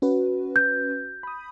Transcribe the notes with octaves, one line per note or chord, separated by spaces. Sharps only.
C#4 F#4 B4
G6
B5 D#6